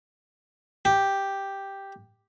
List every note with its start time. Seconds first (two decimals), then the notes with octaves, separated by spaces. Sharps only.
0.85 G4